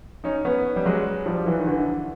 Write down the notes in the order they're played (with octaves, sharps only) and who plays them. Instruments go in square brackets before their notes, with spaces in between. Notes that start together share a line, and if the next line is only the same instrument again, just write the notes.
[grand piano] C#4 D#4
B3 C#4
G3
F#3 G#3
F3 G3
E3 F#3
D#3
D3 E3